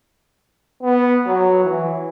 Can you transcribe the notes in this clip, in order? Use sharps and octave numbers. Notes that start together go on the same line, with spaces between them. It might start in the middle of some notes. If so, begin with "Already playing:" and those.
B3
F#3
E3